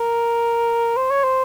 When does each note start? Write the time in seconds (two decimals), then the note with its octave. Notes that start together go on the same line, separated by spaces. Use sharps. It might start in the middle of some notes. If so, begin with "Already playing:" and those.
Already playing: A#4
0.97 C5
1.11 C#5
1.24 C5